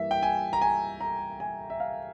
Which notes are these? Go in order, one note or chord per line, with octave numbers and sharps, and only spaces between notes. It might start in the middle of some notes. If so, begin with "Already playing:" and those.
Already playing: G2 E3 A#3 E5
G5
G#5
A#5
G#5
A#5
G#5
E5
F5